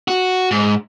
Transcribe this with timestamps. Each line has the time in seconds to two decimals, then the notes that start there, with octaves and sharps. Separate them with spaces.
0.08 F#4
0.51 G#2